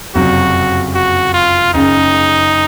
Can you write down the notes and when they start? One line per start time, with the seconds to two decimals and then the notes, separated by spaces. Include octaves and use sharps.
0.15 F#1 F2 C3 F#3 F#4
0.94 F#4
1.34 F4
1.74 F#1 F#2 C#3 D#4